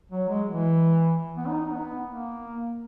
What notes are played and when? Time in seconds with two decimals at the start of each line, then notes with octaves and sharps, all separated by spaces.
0.12 F#3
0.29 G#3
0.47 E3
1.37 B3
1.48 D#4
1.61 D#4
1.72 B3
2.07 A#3